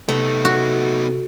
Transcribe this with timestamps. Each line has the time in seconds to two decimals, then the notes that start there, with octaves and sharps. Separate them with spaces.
0.09 C3 A3 B3 D#4
0.45 F#4